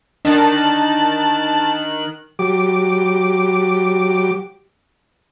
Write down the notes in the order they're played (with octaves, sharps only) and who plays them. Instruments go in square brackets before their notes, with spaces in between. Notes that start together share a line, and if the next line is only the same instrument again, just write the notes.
[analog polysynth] D#3 F#6 [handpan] D4 [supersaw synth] A5
[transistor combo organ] F#3 G4 D6